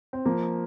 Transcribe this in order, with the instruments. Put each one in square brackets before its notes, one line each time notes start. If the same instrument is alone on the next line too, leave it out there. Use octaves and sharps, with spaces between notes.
[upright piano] C4
F3 A#3